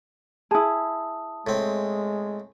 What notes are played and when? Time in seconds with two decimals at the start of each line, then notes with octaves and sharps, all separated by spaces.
0.51 E4 G#4 A5 B5 D#6
1.47 A2 G#3 C4